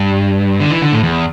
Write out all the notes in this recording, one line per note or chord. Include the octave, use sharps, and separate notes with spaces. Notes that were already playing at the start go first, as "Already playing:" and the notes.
Already playing: G2
D3
E3
D3
A2
E2